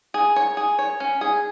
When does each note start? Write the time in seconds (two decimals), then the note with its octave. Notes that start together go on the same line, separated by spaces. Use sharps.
0.14 G#4
0.36 C#5
0.57 G#4
0.79 C#5
1.00 C#4
1.21 G#4